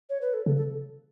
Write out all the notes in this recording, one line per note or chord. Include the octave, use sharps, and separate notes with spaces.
C#5
B4
A4
C#3 A4
A4